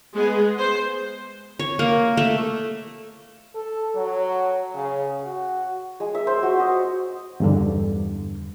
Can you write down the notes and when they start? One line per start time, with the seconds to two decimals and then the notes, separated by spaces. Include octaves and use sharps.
0.13 G#3 B3 G#4
0.58 C5
1.59 C#5
1.79 A#3
2.17 A3
3.55 A4
3.95 F#3
4.74 C#3
5.23 F#4
6.00 G#3
6.15 E5
6.27 C5
6.43 F#4
6.60 D#5
7.40 E2 G2 D3